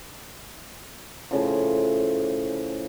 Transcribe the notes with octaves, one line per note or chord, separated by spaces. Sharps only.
A2 C#3 F3